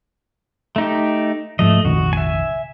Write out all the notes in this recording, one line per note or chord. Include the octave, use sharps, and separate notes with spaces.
A3 D#4 G4
G#2 F3 A3 D#5
F1 A#1 D#3 F#4
E5 G#5